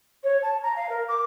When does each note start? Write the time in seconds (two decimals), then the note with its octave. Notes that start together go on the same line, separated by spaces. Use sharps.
0.23 C#5
0.42 A5
0.63 A#5
0.76 F5
0.89 A#4
1.08 D6